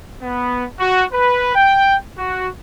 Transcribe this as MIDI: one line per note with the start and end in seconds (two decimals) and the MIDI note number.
0.22 0.65 59
0.80 1.04 66
1.13 1.53 71
1.55 1.97 79
2.18 2.48 66